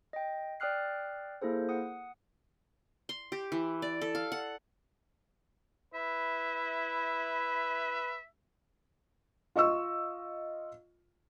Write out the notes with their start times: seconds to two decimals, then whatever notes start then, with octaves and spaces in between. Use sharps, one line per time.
0.13 D#5 G5
0.60 D5 G5 D#6 F6 F#6 C7
1.42 A#3 E4 G#4 A4 C5
1.69 F#5 D#6
3.09 C6
3.32 G4
3.52 E3
3.82 D5
4.01 A4
4.15 F5
4.32 F#5
5.94 E4 B4 E5
9.56 F4 D#5 C#6 E6